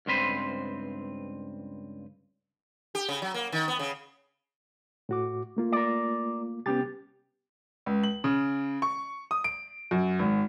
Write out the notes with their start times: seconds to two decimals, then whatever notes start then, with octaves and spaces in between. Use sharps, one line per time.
0.06 C#2 G2 C4 B4 C5
2.95 G4
3.09 C#3
3.22 F#3
3.34 A#3
3.52 D#3
3.68 B3
3.79 C#3
5.09 A2 F#4 D6
5.57 A3 A#3 F4
5.72 A#4 D5
6.66 C2 B3 C#4 G4 A6
7.86 C#2
8.03 F#7
8.24 C#3
8.82 C#6
9.31 D#6
9.44 D7
9.91 F#2
10.19 G#1